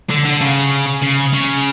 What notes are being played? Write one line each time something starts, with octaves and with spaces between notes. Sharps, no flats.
D3
D3
C#3
C#3
C#3